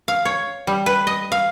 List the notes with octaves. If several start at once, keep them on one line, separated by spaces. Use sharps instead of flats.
F5
C#5
G3
B4
D#5
F5